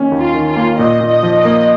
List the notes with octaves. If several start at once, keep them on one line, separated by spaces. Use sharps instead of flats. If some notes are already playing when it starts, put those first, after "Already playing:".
Already playing: D#3 A#3 C#4
D#2
F4
D#3
F4
A#3
A#2 D#5
A#2
D#5
F3
D#5
A#3